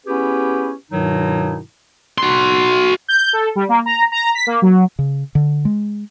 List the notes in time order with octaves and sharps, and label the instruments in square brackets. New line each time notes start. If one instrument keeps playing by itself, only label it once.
[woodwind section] B3 C#4 E4 G4 G#4 B4
G2 B2 D#3 F#3 D#4 E4
[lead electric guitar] F#4 C6
[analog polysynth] G6
A4
G3
A#3
A#5
A#5
B6
A#3
F#3
[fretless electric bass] C#3
D3
G#3